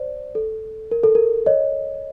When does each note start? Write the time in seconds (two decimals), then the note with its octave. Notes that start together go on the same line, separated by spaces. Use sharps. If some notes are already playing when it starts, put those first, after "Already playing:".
Already playing: C5 D5
0.35 A4
0.91 A#4
1.04 A4
1.15 A#4
1.46 C#5 D#5